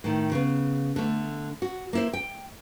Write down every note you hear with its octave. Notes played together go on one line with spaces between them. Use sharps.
A2 D#3
C#3 B3
D3 A3
F#4
A#3 E4 C5
G5